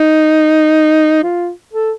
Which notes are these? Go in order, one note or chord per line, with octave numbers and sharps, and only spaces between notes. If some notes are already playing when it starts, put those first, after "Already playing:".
Already playing: D#4
F4
A4